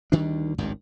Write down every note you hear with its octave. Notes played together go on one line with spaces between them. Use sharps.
D2 D#3 G3 D4
G#1 C#2 G2 D#3